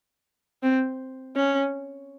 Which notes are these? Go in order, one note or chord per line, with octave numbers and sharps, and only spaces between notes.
C4
C#4